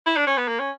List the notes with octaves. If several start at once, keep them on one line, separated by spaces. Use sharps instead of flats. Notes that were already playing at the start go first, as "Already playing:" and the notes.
E4
D4
C#4
B3
A#3
C#4